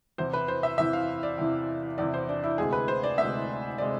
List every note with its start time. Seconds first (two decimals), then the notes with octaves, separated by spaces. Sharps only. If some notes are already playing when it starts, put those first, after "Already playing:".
0.18 E2 C3 E3 C5
0.33 B4
0.48 C5
0.63 E5
0.78 E2 C3 E3 E5
0.93 F5
1.23 D5
1.38 E2 C3 E3
1.98 E2 C3 E3 D5
2.14 C5
2.29 D4
2.44 E4
2.58 D2 C3 G#3 G#4
2.73 B4
2.88 C5
3.03 D5
3.18 D2 C3 G#3 E5
3.78 C3 G#3 D5